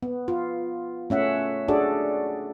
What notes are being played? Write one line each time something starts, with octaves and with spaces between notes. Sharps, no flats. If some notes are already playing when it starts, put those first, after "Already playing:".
B3
F4
A3 C#4 E5 F#5
D4 F#4 G#4 A4 D5